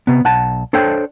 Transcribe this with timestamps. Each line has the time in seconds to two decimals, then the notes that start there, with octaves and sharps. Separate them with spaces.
0.07 C3 B3
0.24 B1 F#5 A5
0.73 D4 A4 C5 C#5 G5